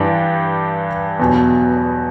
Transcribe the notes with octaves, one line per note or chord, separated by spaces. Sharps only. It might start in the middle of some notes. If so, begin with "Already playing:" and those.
Already playing: G2 E3 G3 D4 G4
E2 B2 F#3